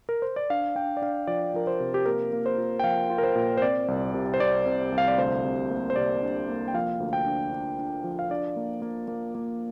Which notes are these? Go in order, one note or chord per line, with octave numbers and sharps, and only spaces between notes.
A#4
C5
D5
D4 F5
D4 G5
D5
D4 F5
F3 D5
F3 A#4
C5
C3
G4
A#3 A#4
A#3
C5
F4
G5
F3 F5
F4
A#4
C5
A#2
C5
C4 D5
C2
C3
C5
C3 D5
C3
C2
F5
D5
D2 C5
C3
A#3
C5
C3 D5
D4
A#3
G5
F3 F5
D2
G5
D4
D4
D4
F3
F5
D4 D5
A#3
A#3
A#3
A#3